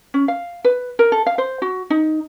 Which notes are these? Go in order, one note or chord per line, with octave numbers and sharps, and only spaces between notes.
C#4
F5
B4
A#4
A4
F5
C5
F#4
D#4